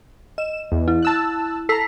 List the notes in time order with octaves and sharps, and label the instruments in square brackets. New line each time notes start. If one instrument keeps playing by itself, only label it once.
[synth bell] D#5 [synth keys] E7
[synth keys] E2
[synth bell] E4
[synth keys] A5 E6 F#6
[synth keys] A4 A#5 [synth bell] E6 B6 C7